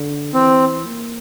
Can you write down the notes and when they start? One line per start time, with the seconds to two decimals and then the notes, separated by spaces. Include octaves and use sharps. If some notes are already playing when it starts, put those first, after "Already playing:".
Already playing: D3
0.34 E3 C4
0.86 A#3